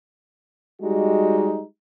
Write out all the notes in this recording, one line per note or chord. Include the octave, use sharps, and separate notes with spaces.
G3 G#3 D#4 F#4 G4